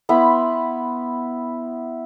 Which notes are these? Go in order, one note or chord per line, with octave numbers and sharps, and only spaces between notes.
B3 E4 B5 C6